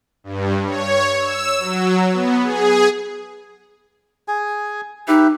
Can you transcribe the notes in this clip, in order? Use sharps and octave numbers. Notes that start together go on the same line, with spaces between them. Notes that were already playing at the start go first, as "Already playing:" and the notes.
G2
C#5
E6
F#3
B3
G#4
G#4 G#5
D#4 G4 B4 E5